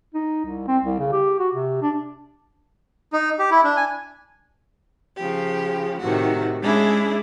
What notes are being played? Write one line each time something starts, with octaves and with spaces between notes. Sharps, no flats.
D#4
C2
C4
C2
C#3
G4
F#4
C3
D4
D#4
G4
E4
D4
G#5
C#3 F3 G4
A2 C3 D#3 F#4
G#3 C#4 D4 E4 G#4